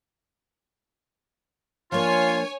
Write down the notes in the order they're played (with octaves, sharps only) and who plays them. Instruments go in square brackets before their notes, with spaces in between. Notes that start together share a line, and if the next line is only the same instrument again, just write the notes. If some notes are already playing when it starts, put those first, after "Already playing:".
[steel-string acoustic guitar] F3 A#3 D4 [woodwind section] F4 [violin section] C#5 G#5